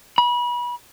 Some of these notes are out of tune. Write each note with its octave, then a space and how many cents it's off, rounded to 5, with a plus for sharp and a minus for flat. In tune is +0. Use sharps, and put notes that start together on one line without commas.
B5 -30